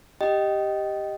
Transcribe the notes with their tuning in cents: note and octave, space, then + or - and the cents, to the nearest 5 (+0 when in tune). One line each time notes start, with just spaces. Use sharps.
G4 +0 D#5 +0 G5 -20